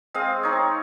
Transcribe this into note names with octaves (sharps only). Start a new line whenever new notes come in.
G#3 C4 D#5 F5
C4 D#4 C#5